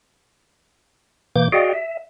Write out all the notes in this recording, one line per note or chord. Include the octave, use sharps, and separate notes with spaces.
B2 E3 A#3 D6 G6
F#4 G#4 D5 D#5 F5 G5
E5